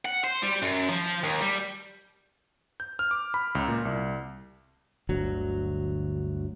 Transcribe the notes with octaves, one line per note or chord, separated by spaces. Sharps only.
F#5
C5
G3
F#2
F3
D#2
G3
G6
F6
D6
B5
C#2
A#2
C2
G1 D2 F#3